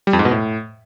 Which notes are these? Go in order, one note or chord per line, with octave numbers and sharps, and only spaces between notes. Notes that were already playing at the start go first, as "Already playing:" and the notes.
G3
F2
G#2
B2
A2